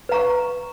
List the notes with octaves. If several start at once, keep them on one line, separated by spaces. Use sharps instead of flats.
B4 F5 A#5 C#6